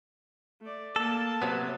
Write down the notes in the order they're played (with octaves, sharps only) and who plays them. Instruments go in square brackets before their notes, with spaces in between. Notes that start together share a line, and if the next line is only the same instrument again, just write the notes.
[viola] A3 D5
[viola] A#3 A5 [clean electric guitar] A4
[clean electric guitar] C3 F#3 B3